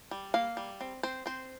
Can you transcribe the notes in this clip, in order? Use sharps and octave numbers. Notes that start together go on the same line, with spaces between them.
G3
A#3 F5
G3
C4
C4 C5
C4 C5